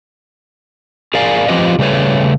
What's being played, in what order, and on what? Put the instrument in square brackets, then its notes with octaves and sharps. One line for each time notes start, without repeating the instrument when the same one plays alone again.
[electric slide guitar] G#4 A#4 D5 F5 G#5
F3 C4 F4 G4 B4 D#5
C#3 G3 A3 B4 C#5